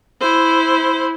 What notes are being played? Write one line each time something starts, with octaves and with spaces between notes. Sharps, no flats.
E4 C5